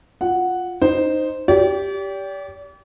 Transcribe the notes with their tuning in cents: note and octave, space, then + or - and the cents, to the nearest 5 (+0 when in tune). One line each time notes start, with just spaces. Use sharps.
F4 +10 F#5 +0
D#4 -10 C5 -5
G4 +0 D5 -40